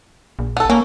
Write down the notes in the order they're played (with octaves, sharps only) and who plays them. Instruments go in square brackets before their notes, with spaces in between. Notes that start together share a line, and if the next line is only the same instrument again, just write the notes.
[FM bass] A#1
[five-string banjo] B3 A4
[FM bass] A#3 [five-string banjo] C#4